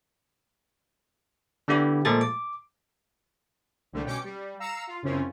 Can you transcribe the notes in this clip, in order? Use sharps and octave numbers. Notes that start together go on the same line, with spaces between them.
D3 G3 B3 E4 G4
A#2 F3 G#3 A3 A4 A6
D6
C2 D3 G3 A3
B2 C#4 G5 D6 C#7
G3
F5 A#5 E6 C#7
F4
F#2 C#3 C4 C#4 E4 F4